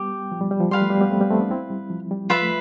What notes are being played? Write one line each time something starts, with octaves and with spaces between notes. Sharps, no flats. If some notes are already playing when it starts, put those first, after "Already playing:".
Already playing: G3 B3 G4
F3
G3
G3
F3
G3 B4 F5 C6
F3 A3
G3 B3
G3 B3
A3 C4
G3 B3
A3 C4
B3 D4
C4 E4
G3
F3
G3
F3 F4 B4 E5 B5
A3